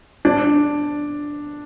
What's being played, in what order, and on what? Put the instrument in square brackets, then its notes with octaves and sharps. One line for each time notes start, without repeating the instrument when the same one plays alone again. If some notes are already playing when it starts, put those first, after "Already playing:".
[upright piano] D4